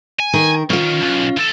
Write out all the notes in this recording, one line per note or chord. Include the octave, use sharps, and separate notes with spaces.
G#5
D#3 A#4
D#3 C#4 F4
B1
E3 A4